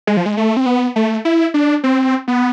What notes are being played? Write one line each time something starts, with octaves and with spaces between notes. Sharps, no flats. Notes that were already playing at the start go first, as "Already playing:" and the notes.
G#3
F3
G#3
A3
C4
B3
A3
E4
D4
C4
B3